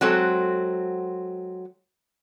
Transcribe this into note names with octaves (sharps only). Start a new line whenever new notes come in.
F#3 G#3 C4 F#4 A4